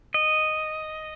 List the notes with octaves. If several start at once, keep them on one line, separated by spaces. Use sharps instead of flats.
D#5